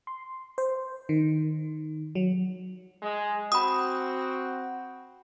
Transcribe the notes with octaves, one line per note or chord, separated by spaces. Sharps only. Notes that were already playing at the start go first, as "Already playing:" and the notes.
C6
C5
D#3
F#3
G#3
C4 F#4 B5 D#6